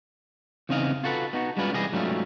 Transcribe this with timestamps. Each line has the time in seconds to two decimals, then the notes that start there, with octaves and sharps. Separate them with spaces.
0.69 E2 C#3 C4 D#4 D#5 F5
1.04 F4 F#4 A4 B4
1.33 B3 D#4 F#4
1.57 G3 G#3 B3 C#4 F4 B4
1.73 C2 E3 G3 G#4 D#5
1.92 G#2 F#3 G3 A3 C#4 F4